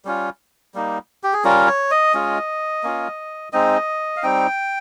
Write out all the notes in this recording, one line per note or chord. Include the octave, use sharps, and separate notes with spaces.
G3 C#4 F4
G3 A#3 D#4
G4
G#4
G3 C#4 F4 A#4
C#5
D#5
G#3 C#4 F4
A#3 C#4 F4
G#3 C4 D#4 D#5
F5
G3 C4 D#4 G5